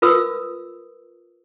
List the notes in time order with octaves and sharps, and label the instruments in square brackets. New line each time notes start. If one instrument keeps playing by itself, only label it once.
[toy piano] F4 A#4 B4 D#6 E6